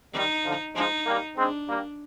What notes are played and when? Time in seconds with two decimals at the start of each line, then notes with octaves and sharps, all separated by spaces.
0.13 D#3 G3 D#4
0.45 D3 F3
0.75 F3 G#3 D#4
1.06 G3 A#3
1.37 G#3 C4 D4
1.68 G3 A#3